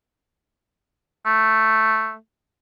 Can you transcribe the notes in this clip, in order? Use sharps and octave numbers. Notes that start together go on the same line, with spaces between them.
A3